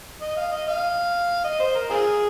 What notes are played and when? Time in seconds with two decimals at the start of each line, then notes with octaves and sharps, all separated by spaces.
0.22 D#5
0.37 F5
0.52 D#5
0.68 F5
1.45 D#5
1.60 C5
1.75 A#4
1.90 C4 F4 G#4